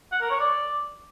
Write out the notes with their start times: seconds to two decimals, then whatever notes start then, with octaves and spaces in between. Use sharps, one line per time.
0.12 F#5
0.21 A#4
0.31 C#5
0.40 D5